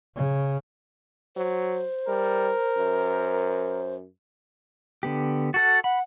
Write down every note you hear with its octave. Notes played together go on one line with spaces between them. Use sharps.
C#3
F#3 C5
G3 A#4
F#2
D3 B3 G4
F#4 A4 F#5 A6
F#5 B5